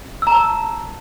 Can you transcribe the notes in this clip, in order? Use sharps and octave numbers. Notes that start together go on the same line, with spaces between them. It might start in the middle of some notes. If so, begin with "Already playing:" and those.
A5 A#5 E6